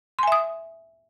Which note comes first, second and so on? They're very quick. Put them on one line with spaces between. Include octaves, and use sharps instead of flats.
C6 G#5 E5 D#6